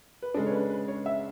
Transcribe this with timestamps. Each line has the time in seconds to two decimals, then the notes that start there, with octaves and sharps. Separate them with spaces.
0.22 B4
0.34 C#3 G#3 D4 A4
0.46 C#5
0.52 B4
0.69 B4
0.88 C#5
1.06 E5